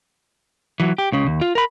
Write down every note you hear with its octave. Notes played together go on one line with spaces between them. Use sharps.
E3 F#3
G4
C#2 C#3
D#2
F4
A#4 B5